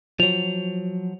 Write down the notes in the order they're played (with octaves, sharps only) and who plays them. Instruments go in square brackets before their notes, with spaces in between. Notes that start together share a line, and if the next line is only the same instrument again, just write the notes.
[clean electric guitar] F3 F#3 [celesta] F7